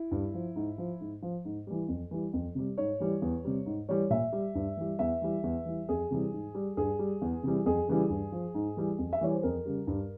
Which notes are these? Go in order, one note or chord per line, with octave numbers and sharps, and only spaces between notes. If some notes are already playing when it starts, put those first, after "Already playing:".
Already playing: E4
G2
F3
G#2
F3
G#2
F3
G#2
E3 G3
F2
E3 G3
F2
C3 G3
G#2 C#5
E3 G3
E2
C3 G3
G#2
E3 G3 C#5
A#2 E5
G3
G2
E3 G3
E2 E5
E3 G3
E2
E3 G3
F2 G#4
C3 E3 G3
G#2
G3
G2 G#4
G3
E2
C3 E3 G3
F2 G#4
C#3 E3 G3
G2
F3
G#2
E3 G3
F2
E5
E3 G3 C#5
C5
F2 A#4
C#3 G3
G2